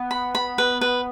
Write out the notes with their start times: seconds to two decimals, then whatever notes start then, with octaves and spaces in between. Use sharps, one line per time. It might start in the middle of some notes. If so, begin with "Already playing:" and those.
Already playing: B3
0.11 B5
0.35 B5
0.58 B4
0.81 B4